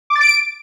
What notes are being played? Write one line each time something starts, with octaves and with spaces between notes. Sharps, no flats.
D6
A6
D7